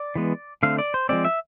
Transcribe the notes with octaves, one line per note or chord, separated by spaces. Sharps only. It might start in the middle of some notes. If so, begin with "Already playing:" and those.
Already playing: D5
E3 G#3 B3
D3 A3 C4 F5
D5
C5
F3 G#3 C4 D5
E5